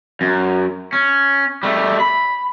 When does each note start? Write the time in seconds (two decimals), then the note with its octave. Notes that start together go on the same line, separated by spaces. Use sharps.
0.21 F#2
0.93 C#4
1.63 G3 A3
2.00 B5